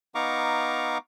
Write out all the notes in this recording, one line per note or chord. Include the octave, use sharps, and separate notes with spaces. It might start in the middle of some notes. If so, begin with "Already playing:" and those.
B3 D#4 F5 A#5 C#6 D6